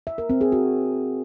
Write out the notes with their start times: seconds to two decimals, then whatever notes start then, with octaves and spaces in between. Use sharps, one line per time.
0.07 E5
0.18 A#4
0.30 C4
0.41 G#4
0.52 F#4